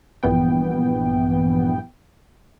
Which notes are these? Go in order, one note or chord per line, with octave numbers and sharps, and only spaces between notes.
A#1 G2 E3 B3 G5